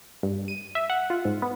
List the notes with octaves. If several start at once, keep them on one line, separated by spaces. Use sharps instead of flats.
G2
D#7
E5
F#5
F4
G#2
B3